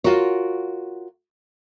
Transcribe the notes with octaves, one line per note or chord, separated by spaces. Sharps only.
F4 F#4 A#4 C#5